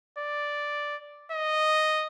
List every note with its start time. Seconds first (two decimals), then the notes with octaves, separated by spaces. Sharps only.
0.19 D5
1.32 D#5